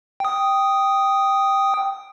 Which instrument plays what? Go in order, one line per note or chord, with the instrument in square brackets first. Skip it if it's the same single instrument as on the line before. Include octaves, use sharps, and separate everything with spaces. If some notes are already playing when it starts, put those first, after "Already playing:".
[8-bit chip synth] G5 D#6